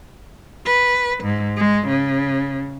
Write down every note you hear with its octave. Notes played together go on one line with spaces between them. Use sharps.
B4
G#2
G#3
C#3